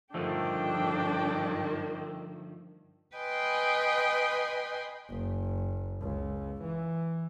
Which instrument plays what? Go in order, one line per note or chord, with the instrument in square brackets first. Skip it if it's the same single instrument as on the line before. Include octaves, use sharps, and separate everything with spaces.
[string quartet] G2 D#3 [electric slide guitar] D3 F3 A3 [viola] D4 G5
[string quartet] B4 D#5 G5 G#5 C6
[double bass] F#1
C#2
E3